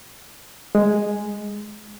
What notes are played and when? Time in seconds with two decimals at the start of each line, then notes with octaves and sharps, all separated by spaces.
0.75 G#3